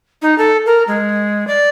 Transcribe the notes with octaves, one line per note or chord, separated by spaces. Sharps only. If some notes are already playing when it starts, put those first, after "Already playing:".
D#4
A4
A#4
G#3
D5